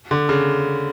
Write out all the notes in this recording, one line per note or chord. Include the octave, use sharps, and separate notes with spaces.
D3
C#3